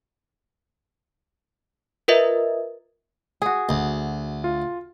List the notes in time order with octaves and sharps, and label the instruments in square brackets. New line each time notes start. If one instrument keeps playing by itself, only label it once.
[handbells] F4 A#4 B4 D#5 E5
[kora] F#4 G#4
[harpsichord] D2
[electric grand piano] F4